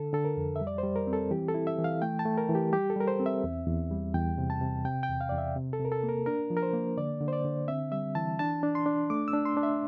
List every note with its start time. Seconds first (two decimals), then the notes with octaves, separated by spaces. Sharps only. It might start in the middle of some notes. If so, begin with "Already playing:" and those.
Already playing: D3 A4
0.13 D3 A4
0.25 A#4
0.37 F2
0.56 E5
0.61 G3
0.67 D5
0.78 C5
0.83 G3
0.96 A#4
1.07 C4
1.13 A4
1.31 E3 G4
1.48 A4
1.54 E4
1.67 E5
1.79 E3
1.84 F5
2.02 A3 G5
2.19 A5
2.25 A3
2.37 A#4
2.49 E3
2.55 G4
2.73 G3 G4
2.90 A4
2.96 G3 A#4
3.08 C5
3.20 C4
3.26 E5
3.44 E2
3.67 E2
3.91 G3
4.14 E2 G5
4.38 C3
4.50 A5
4.61 C3
4.85 C3 G5
5.03 G5
5.09 E2
5.21 F5
5.29 E2 D5
5.38 E5
5.56 C3
5.73 A4
5.80 C3
5.85 A#4
5.92 A4
6.03 A#3
6.09 A#4
6.26 D4 A#4
6.50 F3
6.57 A#4
6.63 C5
6.73 A#3
6.97 D3 D5
7.21 D3
7.28 C5
7.33 D5
7.45 D3
7.68 C4 E5
7.92 G3 E5
8.15 E3 A5
8.39 D4 A5
8.63 D4
8.75 C6
8.86 D4
9.10 A3 D6
9.28 E6
9.33 D4
9.45 C6
9.57 D4
9.63 E5